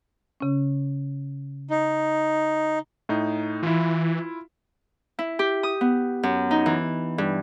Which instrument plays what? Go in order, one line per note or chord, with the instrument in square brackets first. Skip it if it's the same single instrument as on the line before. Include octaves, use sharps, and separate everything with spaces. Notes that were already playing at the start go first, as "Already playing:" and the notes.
[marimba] C#3 C#4
[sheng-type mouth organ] D#4
[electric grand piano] A2 D#4
[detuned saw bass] E3 [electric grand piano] E4 F4
[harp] E4
G4
D#6
B3
F#2
D#4
E3
G2